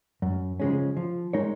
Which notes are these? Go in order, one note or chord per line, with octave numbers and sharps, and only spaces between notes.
F#2
C#3 F3 G#3 C#4
F3
G#3 D#4 A#4 C#5